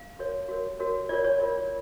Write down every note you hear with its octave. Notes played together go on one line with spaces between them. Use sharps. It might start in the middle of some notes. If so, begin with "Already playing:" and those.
Already playing: F5
F#4 A#4 C#5
F#4 A#4 C#5
F#4 A#4 C#5
F4 A#4 C#5 D5
C#5
F4 A#4 C#5 D5